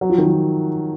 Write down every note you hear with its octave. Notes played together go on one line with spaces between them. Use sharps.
F#3
F3
D#3
F3